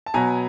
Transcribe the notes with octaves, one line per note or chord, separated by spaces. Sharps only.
A5
B2 F#3 B3 G#5 A#5